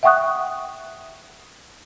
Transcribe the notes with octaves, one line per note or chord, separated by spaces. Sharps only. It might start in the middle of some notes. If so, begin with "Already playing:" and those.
E5 F#5 G5 C#6 D#6 F#6